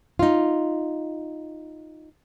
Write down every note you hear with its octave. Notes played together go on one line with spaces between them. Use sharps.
D#4 F4